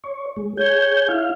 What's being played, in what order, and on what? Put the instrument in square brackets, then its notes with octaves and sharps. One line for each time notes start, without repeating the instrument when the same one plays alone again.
[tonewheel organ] C#5
G#3
[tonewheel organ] G#4 G6 [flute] C#5
[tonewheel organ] E4 F5